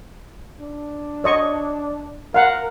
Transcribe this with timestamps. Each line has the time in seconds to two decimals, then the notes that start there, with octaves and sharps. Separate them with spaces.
0.61 D4
1.24 C#5 D#5 C#6
2.34 A#4 F5 F#5